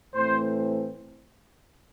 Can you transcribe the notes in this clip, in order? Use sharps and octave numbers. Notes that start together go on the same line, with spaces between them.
A2 E3 A3 C4 C5